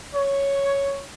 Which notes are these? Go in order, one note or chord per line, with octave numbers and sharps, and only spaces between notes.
C#5